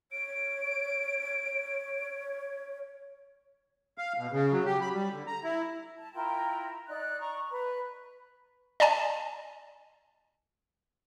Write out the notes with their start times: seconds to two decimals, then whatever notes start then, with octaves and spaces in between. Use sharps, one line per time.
0.12 C#5 D7
3.98 F5
4.18 B2
4.32 C#3
4.52 F#3
4.66 G4
4.81 B5
4.94 G3
5.12 D3
5.27 A#5
5.44 E4
5.96 A5
6.14 E4 F4 A#4 G5
6.88 D#4 D5 F#6
7.20 D5 A#5 C#6
7.52 B4
8.80 D5 D#5 G#5 A5